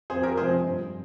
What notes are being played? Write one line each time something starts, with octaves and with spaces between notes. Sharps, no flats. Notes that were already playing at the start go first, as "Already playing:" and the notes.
F2 G#4 C5
G4 A#4
C3 F3 G#3 C4 G#4 C5
G2